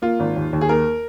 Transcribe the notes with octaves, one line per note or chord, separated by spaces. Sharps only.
A#3 F4
G#1
D#2
D#2
G#4
A#3 A#4